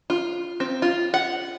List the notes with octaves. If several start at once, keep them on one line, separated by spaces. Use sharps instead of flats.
F4
C4
F4
F#5